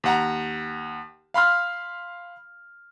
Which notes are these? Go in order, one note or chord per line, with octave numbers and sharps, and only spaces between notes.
D#2 F#5 A#5
F5 B5 C6 F6